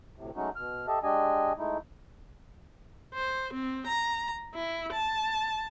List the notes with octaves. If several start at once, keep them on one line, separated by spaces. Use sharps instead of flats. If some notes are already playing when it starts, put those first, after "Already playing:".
D2 A2 C3
F#3 G#3 A3 C#4 D#4 F#4
B2 F6
G4 A4 D#5 E5 A5
G#3 D4 G4 D#5 G#5
G#3 A3 D#4 E4
C5
C4
A#5
E4
A5